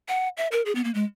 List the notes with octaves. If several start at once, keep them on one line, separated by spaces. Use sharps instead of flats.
F#5
E5
A#4
G#4
B3
A#3
G#3